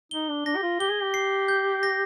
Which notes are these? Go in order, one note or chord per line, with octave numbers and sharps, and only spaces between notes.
D#4 G7
D4
D4 A#6
G4
F4
G4 G7
G#4
G4
C7
G6
A#6